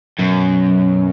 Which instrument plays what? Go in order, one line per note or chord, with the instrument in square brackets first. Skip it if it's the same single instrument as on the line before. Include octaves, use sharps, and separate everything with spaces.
[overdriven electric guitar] F#2 [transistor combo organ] B2